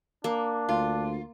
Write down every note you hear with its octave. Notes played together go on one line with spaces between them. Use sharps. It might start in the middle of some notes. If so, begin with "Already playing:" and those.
A#3 D4
D2 F4